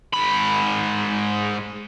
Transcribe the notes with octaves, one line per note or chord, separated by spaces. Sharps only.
G#2 B5